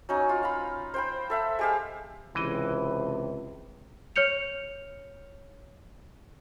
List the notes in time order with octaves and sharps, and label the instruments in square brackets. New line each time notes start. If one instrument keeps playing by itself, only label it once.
[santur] F#3 C#4 D#4
F4
F5 B5
C5 G5 B5
A4 E5 F#5
G#3 G4 F5
[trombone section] C#2 C3 [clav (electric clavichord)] E3 D#5
[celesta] C#5 F6 G6 C#7 F7